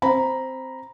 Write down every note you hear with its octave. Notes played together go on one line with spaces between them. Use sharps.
C4 A#5 B5